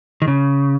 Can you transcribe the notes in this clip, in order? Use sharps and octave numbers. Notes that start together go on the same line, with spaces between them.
D#3
C#3